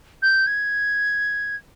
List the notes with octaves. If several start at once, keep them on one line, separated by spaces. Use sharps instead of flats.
G6
G#6